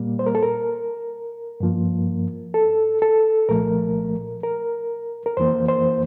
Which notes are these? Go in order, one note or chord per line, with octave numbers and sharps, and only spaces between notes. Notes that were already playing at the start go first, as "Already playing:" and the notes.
Already playing: A#2 G3 A#3
C5
A#4
A4
A#4
G2 F3 A#3
A4
A4
C2 A#2 F3 A3 A#4
A#4
A#4
F2 E3 A#3 C5
C5